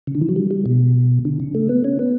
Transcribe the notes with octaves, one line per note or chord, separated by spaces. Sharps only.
C#3
D3
E3
F#3
G3
G3
B2
D3
C#3
A3
B3
C#4
B3